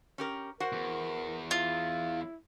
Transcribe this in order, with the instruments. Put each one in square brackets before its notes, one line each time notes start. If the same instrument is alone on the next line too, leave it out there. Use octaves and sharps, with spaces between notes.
[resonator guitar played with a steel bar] C#4 G4 A#4
[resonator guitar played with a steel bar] F#4 C5 F#5 [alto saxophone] A#4
[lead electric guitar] E2
[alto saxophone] E4 [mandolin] F4